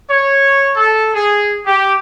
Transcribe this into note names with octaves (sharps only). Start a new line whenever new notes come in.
C#5
A4
G#4
G4